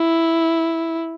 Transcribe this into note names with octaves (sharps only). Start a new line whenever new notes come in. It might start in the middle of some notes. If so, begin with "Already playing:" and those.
Already playing: E4